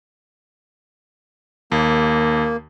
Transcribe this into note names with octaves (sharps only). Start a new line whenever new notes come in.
D#2 A#3